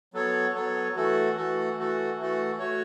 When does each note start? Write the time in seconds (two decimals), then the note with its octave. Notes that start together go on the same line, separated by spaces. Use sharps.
0.14 F#3 B3 A4 C#5
0.55 F#3 B3 A4 C#5
0.96 E3 A3 F#4 A4
1.36 E3 A3 F#4 A4
1.78 E3 A3 F#4 A4
2.18 E3 A3 F#4 A4
2.59 A3 F#4 C#5